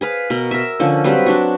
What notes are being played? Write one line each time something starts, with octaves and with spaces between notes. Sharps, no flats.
G#4 B4 F5
B2 A#4
A#4 E5
D3 F3 C#4
F#3 G3 C4 B4
F#3 D4 F#4